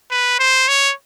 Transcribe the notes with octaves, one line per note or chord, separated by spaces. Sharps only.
B4
C5
C#5